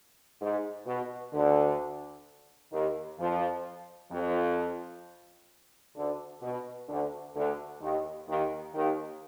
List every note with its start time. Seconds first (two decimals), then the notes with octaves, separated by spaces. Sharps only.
0.41 G#2
0.86 B2
1.34 D2 D3
2.72 D#2 D#3
3.18 F2 F3
4.11 F2 F3
5.96 D2 D3
6.42 B2
6.89 D2 D3
7.36 D2 D3
7.81 D#2 D#3
8.28 D#2 D#3
8.74 D#2 D#3